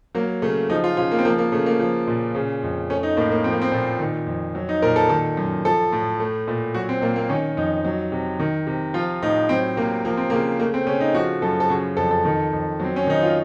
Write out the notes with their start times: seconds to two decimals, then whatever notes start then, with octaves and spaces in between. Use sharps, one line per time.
0.15 F#3 A#3
0.42 C#3 A3
0.70 F3 D#4
0.84 F4
0.97 C#3 F4
1.11 A#3
1.18 C4
1.25 F3 A#3
1.38 A#3
1.52 C#3 A3
1.66 A#3
1.80 F3
2.07 A#2
2.35 C#3
2.63 F2
2.90 A3 C#4
3.03 D#4
3.17 A2 A#3
3.32 A#3
3.44 F3 C4
3.53 A#3
3.62 C4
3.72 A#2
4.00 D#3
4.27 F2
4.55 F#3
4.69 D#4
4.82 A#2 A#4
4.96 A4
5.09 D#3 A4
5.37 F#2
5.65 F3 A4
5.92 A2
6.20 A3
6.48 A#2
6.74 F#3 F#4
6.89 C4
7.02 A#2 A#3
7.16 A#3
7.29 D#3 C#4
7.57 F2 D#4
7.85 F#3
8.12 C3
8.40 D#3
8.67 C3
8.94 F3 F4
9.22 A2 D#4
9.49 F#3 C4
9.77 C3 A#3
10.05 F3 A#3
10.17 C4
10.30 C#3 A#3
10.59 A3 A#3
10.74 C4
10.87 C#3 C#4
11.01 D#4
11.15 F3 F#4
11.42 F#2 A4
11.60 A4
11.70 C#3 F#4
11.97 F2 A4
12.11 A4
12.25 D#3
12.53 F2
12.80 F#3 C4
12.96 C#4
13.07 D#3 D#4
13.22 F4